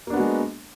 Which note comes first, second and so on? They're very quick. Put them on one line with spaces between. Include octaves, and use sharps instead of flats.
A#3 D4 B3 F#4 G#3